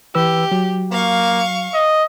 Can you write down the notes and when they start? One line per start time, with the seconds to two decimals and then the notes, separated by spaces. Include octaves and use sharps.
0.15 E3 G4 B4 E6
0.52 F#3
0.92 A#3 F5 C#6
1.74 D#5